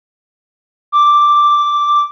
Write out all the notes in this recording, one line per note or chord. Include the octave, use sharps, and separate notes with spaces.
D6